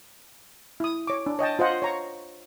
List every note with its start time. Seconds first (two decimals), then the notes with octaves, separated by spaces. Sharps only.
0.80 E4 D#6
1.07 C#5 D6
1.26 D4
1.39 C#5 D#5 G5 A5
1.59 F4 C5 D#5 F#5
1.82 C#5 A#5 C#6